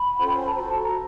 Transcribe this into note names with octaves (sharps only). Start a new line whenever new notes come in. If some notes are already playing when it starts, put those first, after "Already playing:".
Already playing: B5
C#4 F4 A4 C5 F#5
G5
G#5
A5
F#4 A4 C5 A#5
A5
A#5